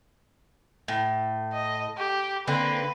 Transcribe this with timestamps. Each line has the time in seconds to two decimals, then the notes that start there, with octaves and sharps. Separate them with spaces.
0.88 A2
1.53 D#5
1.98 G4
2.48 D3 A#3 C4 B4